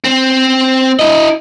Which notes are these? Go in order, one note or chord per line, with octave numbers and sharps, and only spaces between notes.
C4
E4 D#5